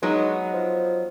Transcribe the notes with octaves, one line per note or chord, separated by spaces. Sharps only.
F#3 G#3 B3 D#4
F3